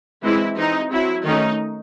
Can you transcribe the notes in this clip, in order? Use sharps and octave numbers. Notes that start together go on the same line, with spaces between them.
E3 G#3 C4 E4
E3 C4 D#4
F#3 C4 E4
D#3 A3 C#4 D#4